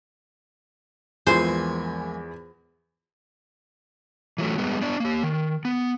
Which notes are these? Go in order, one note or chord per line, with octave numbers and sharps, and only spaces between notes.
A#1 E2 E3 G#3 F4 C5 G#5
E3 F#3 A3
G3 G#3 B3
B3 D4 D5
A#3 G4
D#3
B3